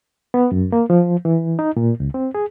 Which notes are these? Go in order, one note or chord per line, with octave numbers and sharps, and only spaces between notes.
B3
F#2
A#3
F3
E3
D#4
A#2
C#2
C4
G#4